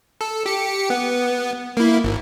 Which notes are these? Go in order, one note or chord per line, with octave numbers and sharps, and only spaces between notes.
A4
G4 C#7
B3
A#3 E4
G#1